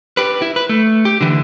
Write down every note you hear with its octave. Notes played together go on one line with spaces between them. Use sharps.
G4 B4
E4
B4
A3
G4
D3 E3